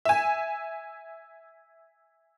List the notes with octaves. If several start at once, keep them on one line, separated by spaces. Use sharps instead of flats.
E5 G#5